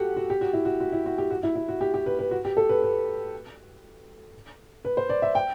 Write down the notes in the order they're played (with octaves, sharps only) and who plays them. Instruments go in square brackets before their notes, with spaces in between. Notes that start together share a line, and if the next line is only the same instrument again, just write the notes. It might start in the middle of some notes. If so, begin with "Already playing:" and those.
Already playing: [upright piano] F#4 G4 A4 F#5
F#4
G4
F#4
E4
F#4
F#4
E4
F#4
G4
F#4
E4
E4
F#4
G4
G4
B4
B4
F#4
G4
A4
B4
B4
B4
C5
D5
E5
G5